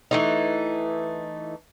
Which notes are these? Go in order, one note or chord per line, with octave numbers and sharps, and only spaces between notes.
E3 A3 D#4